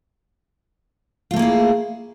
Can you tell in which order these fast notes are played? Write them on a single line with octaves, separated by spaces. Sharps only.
F4 A3 A#3 G#4 E4